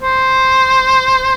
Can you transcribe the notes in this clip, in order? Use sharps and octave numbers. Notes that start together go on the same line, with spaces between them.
C5